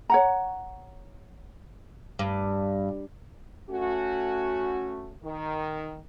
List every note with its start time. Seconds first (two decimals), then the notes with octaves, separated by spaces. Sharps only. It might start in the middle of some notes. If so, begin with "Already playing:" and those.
0.10 C#5 F#5 A#5
2.19 G2
3.70 A3 C#4 F#4
5.23 D#3